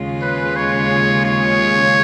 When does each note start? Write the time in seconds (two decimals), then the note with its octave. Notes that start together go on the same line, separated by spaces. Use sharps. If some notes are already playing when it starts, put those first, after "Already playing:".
Already playing: D#2 C#3 G#3 C#4 F4
0.21 B4
0.56 C#5
1.25 C#5